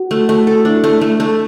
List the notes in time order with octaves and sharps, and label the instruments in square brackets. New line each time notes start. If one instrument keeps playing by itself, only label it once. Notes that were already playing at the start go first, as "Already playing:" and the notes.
Already playing: [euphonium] F#4
[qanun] A3
A3
A4
[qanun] D4 [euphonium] E4
[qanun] A3
A3
A3